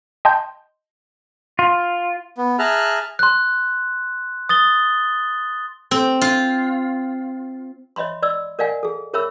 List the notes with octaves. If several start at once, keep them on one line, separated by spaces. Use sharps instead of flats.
D#5 G5 A5 C6 G6
F4
B3
G#4 E5 A5 A#5 F6 F#6
C6 F#6
D#6 A6 G7
C4
F4
C#5 D#5 E5 B5 C6
D5 D#5 E6
A#4 D5 D#5 F5 F#5 G#5
G#4 A4
G#4 A#4 C#5 E5 B5 E6